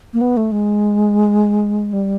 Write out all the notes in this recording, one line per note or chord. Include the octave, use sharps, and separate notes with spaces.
A#3
B3
A3
G#3
G3